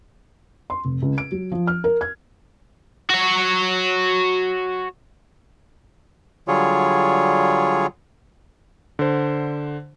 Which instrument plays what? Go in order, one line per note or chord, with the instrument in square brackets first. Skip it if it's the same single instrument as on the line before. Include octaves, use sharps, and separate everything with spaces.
[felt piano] C6
F1
C#2
D7
F#3
F3
F6
A#4
G#6
[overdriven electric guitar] F#4 C#5
[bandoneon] D3 F#3 G3 F4 G#4 C#5
[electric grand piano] D3 C5